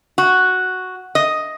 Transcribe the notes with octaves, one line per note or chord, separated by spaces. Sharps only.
F#4
D#5